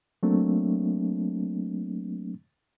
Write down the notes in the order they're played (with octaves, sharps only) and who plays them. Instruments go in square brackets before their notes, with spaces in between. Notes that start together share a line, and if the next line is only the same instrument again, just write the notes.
[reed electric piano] F#3 A3 A#3 C4 D4